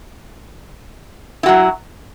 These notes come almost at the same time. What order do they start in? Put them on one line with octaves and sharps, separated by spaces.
E4 F#4 F#3